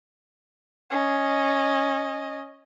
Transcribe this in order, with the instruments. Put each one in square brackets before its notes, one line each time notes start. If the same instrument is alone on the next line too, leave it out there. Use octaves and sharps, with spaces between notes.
[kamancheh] C#4 D#5